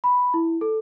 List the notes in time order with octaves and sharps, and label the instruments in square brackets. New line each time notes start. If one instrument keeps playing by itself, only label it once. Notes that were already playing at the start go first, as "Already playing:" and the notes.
[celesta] B5
E4
A4